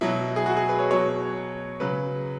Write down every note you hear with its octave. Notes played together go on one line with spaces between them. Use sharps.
B2 F#3 E4
G#4
F#4
G#4
B4
C#5
B2 F#3 C#5
C#3 F#3 B4